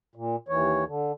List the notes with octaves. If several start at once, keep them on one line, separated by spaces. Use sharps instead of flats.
A#2
D#2 E3 C#5
D3